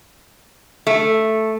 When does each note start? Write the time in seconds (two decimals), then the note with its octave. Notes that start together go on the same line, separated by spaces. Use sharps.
0.87 A3